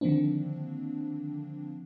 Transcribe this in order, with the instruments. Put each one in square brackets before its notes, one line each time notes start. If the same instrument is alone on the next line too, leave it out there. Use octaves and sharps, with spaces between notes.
[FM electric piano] D3 D#3 F3 A#3 C4 D4